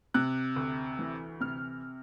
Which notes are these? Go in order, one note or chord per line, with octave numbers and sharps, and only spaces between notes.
C3 F#6
D2
E3
C3 F6